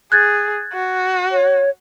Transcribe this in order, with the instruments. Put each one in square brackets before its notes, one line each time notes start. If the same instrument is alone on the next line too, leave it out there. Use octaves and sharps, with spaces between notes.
[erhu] G#4 [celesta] F#6 G#6 A6
[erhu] F#4
[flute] C#5